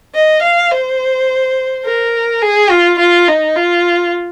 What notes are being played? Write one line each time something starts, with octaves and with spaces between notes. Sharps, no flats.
D#5
F5
C5
A#4
G#4
F4
F4
D#4
F4